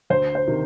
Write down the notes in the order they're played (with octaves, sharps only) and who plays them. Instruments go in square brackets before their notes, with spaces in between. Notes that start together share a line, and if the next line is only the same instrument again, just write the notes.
[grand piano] D2 [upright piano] C5
[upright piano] C5
[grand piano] C3 D#3